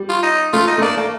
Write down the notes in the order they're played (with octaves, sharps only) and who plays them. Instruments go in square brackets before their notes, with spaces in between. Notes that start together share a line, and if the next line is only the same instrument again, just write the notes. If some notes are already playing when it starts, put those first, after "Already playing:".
Already playing: [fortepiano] G3
[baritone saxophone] F4
D#4
[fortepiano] A3 [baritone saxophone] F4
[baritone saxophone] D#4
[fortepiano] A3
[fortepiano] A#3 [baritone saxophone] D4
[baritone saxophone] A3 [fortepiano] A#3